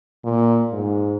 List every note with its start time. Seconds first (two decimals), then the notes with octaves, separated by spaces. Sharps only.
0.24 A#2
0.71 G#2